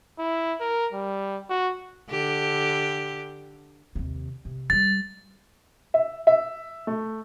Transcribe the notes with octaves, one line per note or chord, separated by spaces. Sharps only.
E4
A#4
G3
F#4
D3 G4
D#2 C3
C3
G3 G#3 A6
E5
E5
A3